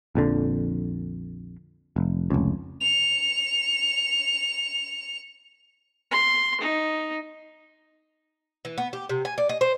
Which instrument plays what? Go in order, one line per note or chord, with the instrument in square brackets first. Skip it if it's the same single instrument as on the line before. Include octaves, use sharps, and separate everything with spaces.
[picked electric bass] A#1 F2 D3
F1
F1 C#2
[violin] C#7 F7
[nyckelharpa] C6
D#4
[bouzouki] E3
B3
G4
C3
G#5
D5
D#5
C5